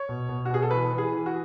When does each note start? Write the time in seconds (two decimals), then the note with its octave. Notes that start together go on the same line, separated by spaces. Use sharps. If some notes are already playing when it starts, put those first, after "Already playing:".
Already playing: C#5
0.09 B2
0.29 B2
0.45 F#4
0.50 B2 G#4
0.62 A4
0.71 E3 B4
0.91 E3
0.98 G#4
1.13 E3
1.26 F#4